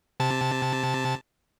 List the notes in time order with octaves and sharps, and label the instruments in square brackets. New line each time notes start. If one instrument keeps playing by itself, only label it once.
[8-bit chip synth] C3 A5